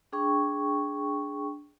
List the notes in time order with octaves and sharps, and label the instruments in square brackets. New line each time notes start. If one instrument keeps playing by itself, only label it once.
[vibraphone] D4 G#4 G5 C#6